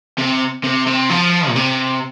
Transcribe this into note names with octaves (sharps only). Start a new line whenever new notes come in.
C3
C3
C3
F3
A#2
C3